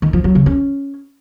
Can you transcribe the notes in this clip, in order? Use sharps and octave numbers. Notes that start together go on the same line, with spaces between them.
D#3
F3
F#3
C#3
C#4